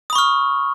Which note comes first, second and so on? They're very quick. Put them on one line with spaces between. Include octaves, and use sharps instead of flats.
D#6 B5 C#6 F6